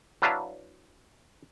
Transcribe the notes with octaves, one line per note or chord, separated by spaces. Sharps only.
F#3 D4 E4 B4 F5 A5